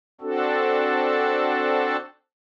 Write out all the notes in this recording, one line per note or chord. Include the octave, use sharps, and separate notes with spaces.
C4 D4 F#4 A4